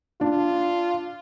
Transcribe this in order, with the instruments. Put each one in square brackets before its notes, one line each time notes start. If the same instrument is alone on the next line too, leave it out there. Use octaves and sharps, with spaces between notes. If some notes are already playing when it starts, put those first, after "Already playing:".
[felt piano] D4 [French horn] F4